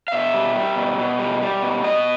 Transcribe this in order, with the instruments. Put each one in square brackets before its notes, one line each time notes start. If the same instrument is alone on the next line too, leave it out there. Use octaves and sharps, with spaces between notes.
[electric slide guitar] F5
B2 E5
G3
G3
B2
B2
G3
G3
B2
B2 D#5